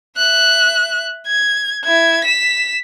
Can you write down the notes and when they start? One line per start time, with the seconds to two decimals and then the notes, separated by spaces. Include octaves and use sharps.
0.17 E5 F#6
1.27 G#6
1.85 E4 G#6
2.24 B6 E7